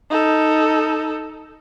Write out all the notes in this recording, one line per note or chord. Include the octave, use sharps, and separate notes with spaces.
D#4 A4